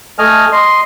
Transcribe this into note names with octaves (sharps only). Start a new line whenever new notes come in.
A3 D#5 G#5 F6
D#5 C6